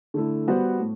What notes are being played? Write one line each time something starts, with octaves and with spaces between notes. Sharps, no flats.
D3 A3 E4
G3 B3 F#4 C5
A2